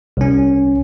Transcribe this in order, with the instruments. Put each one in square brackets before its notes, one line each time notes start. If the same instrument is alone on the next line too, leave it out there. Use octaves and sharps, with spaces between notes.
[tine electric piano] C2 C#4